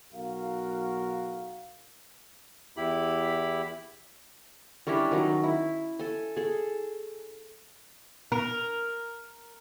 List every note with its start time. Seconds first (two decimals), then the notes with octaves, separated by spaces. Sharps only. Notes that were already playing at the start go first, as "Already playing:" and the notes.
0.13 B1 F#4 A#4 F5
2.77 E2 E4 G4 B5
4.87 G3 C#4 D4 E4
5.11 D#3 F#3 D#4
5.43 E4
5.99 A4 G#5
6.36 G#4 A4
8.32 A#4